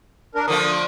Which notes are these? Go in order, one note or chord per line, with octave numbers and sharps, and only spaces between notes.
D4 A#4
D3 F3 A3 D#6